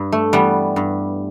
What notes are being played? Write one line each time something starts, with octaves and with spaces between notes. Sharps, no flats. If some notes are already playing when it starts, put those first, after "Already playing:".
Already playing: G2
A3
E3 G3 B3
G2